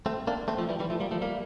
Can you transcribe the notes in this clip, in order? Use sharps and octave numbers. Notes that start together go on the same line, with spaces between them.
A3 C4
A#3 D4
A3 C4
F3 A3
E3 G3
E3 G3
F3 A3
G3 A#3
F3 A3
G3 A#3